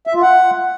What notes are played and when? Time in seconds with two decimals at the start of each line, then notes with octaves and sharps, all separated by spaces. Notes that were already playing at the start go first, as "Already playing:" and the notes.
0.07 E5
0.15 F4
0.22 F#5